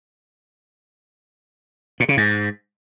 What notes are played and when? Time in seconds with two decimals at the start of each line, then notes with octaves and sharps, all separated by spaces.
2.00 A#2
2.09 C#3
2.17 G#2